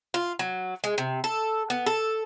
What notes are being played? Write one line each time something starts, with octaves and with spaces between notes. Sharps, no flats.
F4
F#3
G#3
C3
A4
B3
A4